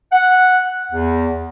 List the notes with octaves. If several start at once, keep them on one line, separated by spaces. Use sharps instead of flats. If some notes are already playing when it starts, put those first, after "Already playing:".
F#5
E2